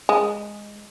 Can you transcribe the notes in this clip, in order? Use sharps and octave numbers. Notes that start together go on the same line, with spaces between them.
G#3